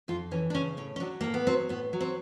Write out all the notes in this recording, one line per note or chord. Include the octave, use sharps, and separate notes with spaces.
F2 F4
E3 C#4
D4
C#3 C#4
A2 C#4
C#4
F#3 D4
A2 A#3
B3
F#3 C4
A2 B3
F#3
C4